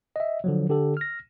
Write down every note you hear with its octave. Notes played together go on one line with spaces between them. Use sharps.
D#5 E5
D3 F3 F#3
D3 G4 A4
F6 A#6